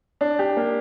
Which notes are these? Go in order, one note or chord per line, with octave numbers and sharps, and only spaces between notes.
D4
G4
A#3